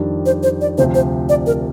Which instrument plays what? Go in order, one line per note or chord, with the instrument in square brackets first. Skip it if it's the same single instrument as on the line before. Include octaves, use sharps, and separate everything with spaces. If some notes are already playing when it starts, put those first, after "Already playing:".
Already playing: [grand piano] F2 D#3 G3 D4
[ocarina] C5
C5
D5
[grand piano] D2 C3 F3 [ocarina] C5
[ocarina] C5
D5
A#4